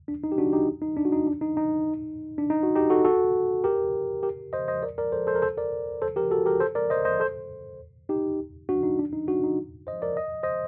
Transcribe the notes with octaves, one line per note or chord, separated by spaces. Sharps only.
D4
D#4
G4
D4 F#4
D#4 G4
D#4
D4
F#4
D#4
D4
D#4
D#4
D4
D#4
F#4
D#4 G4
F#4 A4
F#4 A4
G4 A#4
G4 A#4
C5 D#5
C5 D#5
A#4 D5
A#4 D5
A4 C5
A4 C5
A#4
A4 C5
A#4 D5
A4 C5
G4 A#4
F#4 A4
G4 A#4
A4 C5
A#4 D5
C5 D#5
C5 D#5
A4 C5
D#4 G4
D4 F#4
D#4
D4
D#4
D4 F#4
D#4
C5 D#5
A#4 D5
D#5
C5 D#5